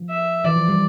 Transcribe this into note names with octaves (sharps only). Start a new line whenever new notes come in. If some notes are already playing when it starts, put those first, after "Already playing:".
Already playing: F3
E5
E3 D5
F3
G3